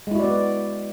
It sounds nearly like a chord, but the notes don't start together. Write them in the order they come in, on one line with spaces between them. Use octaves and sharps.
G#3 E4 F#4 D5 B3